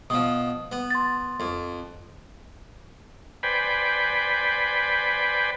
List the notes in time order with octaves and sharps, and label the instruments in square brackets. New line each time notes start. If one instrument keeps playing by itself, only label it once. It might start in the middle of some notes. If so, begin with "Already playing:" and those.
[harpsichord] B2 F3 [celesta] D#6
[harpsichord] B3
[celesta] C6 A6
[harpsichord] F2
[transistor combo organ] B4 C5 D5 G5 G#5 B5